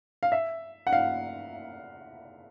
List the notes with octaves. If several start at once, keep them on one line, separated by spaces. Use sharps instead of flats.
F5
E5
F#5
F5